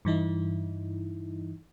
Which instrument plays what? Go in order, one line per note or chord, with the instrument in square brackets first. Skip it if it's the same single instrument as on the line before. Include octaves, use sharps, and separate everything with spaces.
[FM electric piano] G2 E3 D#4 E4